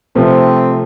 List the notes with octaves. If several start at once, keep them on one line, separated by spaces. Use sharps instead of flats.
C3 F3 A3 C4